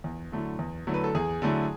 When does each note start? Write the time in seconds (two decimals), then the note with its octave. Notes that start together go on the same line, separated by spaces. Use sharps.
0.04 E2
0.32 D3 F#3 A3 E4
0.59 E2
0.87 D3 F#3 A3 E4
0.94 B4
1.04 A4
1.15 E2 G#4
1.42 D3 F#3 A3 E4